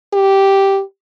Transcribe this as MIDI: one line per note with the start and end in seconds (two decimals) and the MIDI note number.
0.13 0.82 67